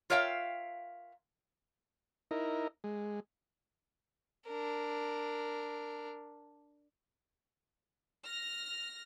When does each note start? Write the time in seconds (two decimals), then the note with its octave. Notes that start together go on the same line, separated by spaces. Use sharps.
0.10 F4 A#4 C#5 E5 F5 G5
2.31 D#4 E4 A#4
2.84 G#3
4.47 D4 A#4
8.25 F6 A#6